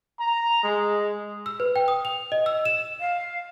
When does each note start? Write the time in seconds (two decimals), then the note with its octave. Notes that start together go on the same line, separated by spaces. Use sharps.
0.19 A#5
0.64 G#3
1.46 E6
1.60 B4
1.76 G5
1.88 D#6
2.05 F7
2.32 D#5
2.46 E6
2.65 E7
3.00 F5